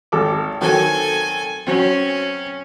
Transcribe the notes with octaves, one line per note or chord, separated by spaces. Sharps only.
G#1 A4 D6
D#3 F#3 C4 A4 G#5
F#3 C4 C#4